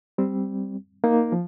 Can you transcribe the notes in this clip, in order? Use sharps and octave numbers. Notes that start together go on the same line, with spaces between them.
G3 C4
A#3 D#4
F3